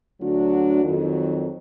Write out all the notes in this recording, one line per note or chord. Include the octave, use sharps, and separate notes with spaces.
D2 D3 F#3 D4 F#4
F2 D#3 F#3